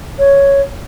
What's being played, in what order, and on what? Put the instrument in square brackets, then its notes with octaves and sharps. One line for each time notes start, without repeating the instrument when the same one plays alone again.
[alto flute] C#5